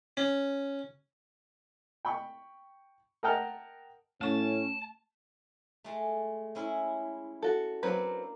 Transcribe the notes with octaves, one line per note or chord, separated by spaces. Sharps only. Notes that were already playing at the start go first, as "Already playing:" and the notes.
C#4
G5 B5 C#6
A#4 D#5 F#5 G5 A5 F6
A2 A3 C#4 A5 C#6
G#3 A3
G#3 C#4 E4
F#4 A4
F#3 A#3 C4 D4 B4